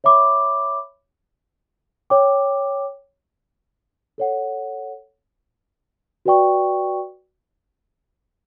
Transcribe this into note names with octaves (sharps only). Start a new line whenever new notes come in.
C#5 E5 B5 D6
C#5 G5 D6
A4 C#5 F#5
F#4 B4 D5 G5 C#6